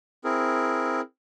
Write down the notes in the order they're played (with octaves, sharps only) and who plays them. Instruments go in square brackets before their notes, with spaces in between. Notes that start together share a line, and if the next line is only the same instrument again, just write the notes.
[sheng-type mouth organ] C4 E4 G#4 A#4